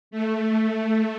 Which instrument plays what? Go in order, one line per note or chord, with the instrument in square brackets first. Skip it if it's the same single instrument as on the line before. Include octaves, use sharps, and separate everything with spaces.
[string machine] A3